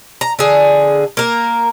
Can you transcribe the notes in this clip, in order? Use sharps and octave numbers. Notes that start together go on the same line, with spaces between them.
A#5
D3 G#4
A#3 A#4